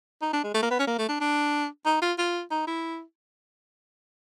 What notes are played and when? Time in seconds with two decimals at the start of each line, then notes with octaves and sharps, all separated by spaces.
0.22 D#4
0.33 D4
0.44 G#3
0.55 A3
0.63 A#3
0.71 B3
0.80 C#4
0.88 A#3
0.99 A3
1.09 D4
1.20 D4
1.86 D#4
2.02 F4
2.18 F4
2.51 D#4
2.67 E4